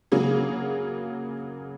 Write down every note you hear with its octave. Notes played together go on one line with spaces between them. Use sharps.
C#3 F#3 A#3 G#4